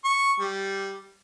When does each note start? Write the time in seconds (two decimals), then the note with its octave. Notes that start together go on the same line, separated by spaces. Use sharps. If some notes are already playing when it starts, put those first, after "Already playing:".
0.05 C#6
0.40 G3